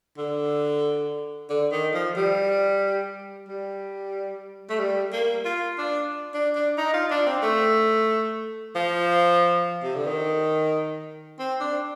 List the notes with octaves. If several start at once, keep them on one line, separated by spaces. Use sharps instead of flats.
D3
D3
D#3
F3
G3
G3
A3
G3
A#3
F4
D4
D4
D4
D#4
F4
D4
C4
A3
F3
C3
D3
D#3
C4
D4